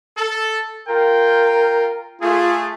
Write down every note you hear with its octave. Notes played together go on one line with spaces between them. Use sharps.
A4
F4 A#4 G5
A3 F4 G#4